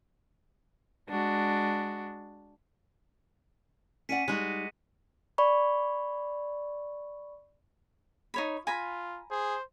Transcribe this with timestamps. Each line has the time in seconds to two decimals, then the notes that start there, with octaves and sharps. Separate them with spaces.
1.09 G#3 D4 F#4
4.09 C#4 D5 F#5 B6 C#7 D#7
4.28 G3 G#3 D#4 F#4
5.38 D5 B5 C#6
8.34 D#4 C#5 B5
8.67 F4 G#5 A#5 B5
9.31 G#4 C5